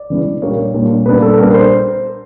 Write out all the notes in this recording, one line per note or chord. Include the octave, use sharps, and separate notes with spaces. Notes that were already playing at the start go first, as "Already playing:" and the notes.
Already playing: D5
E3 G#3 B3 D4
A#2 G3 A#3 D4 C#5
A#2 G3 A#3 D4
A#2 G3 B3 D4 B4
A4
A#2 G3 B3 D4 A#4
C5